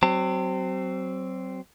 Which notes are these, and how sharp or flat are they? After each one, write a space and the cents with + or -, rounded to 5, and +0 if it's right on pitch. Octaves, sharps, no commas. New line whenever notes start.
F#3 +30 C4 +0 A5 +45